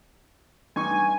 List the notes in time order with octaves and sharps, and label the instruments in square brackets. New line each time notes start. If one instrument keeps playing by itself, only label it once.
[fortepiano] G2 D#4 C#6 [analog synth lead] G#5